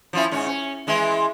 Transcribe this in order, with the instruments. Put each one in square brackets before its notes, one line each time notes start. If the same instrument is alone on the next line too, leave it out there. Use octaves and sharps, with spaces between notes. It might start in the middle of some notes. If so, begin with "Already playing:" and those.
[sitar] F3 C#4 E4
G#2 C#4
C#4
E3 G#3 E4